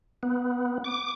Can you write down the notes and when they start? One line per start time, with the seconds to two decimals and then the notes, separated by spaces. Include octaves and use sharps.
0.23 B3
0.84 D6